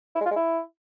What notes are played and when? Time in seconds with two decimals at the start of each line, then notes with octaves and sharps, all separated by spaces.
0.15 E4
0.21 G#3
0.26 F4
0.31 G#3
0.36 E4